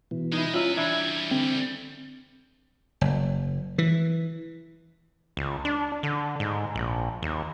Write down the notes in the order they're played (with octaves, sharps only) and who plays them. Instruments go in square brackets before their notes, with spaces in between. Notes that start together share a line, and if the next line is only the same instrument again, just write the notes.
[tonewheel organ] B2 E3
[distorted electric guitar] G#3 [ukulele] D#4 E4
[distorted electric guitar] B2 B4 [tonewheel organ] C#4 [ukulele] F4 E5 A#5
[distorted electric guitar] E3 G3 [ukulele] D4 E4 E5 [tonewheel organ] G#6
[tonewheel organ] D3 [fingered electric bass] C4
[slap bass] F#1
E3
[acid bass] C#2
D4
D3
G#2
A#1
D#2